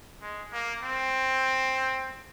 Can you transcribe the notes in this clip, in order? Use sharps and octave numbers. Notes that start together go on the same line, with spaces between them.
G#3
A#3
C4